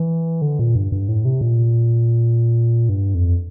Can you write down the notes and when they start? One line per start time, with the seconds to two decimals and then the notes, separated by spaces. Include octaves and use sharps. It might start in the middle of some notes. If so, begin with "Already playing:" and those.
Already playing: E3
0.42 D3
0.59 A#2
0.75 G2
0.92 G2
1.08 A2
1.25 C3
1.41 A#2
2.89 G2
3.15 F2